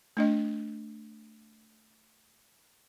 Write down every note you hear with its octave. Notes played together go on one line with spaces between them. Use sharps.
A3 D4 D#5